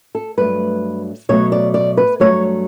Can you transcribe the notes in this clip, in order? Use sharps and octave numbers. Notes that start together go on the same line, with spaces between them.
A4
G2 F#3 A3 B4
B2 F#3 A3 C#5
D5
D5
B4
G2 F#3 A3 C#5